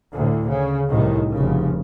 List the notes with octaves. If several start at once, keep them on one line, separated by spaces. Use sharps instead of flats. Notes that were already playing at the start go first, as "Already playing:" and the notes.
D2 A2
C#3
C2 A2 D#3
F1 C#3